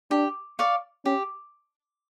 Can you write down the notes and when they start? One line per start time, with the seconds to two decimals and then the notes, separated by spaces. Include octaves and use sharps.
0.11 D4 G4
0.59 D5 F5 C#6
1.05 C#4 G4